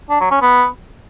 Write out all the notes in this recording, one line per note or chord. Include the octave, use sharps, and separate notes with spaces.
D4
F#3
C#4
B3